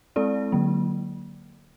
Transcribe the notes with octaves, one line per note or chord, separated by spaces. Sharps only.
G#3 C4 E4 A4 D5
D3 F#3 A#3